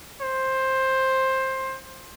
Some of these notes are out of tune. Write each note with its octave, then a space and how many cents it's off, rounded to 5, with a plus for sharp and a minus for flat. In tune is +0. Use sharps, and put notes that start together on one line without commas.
C5 +15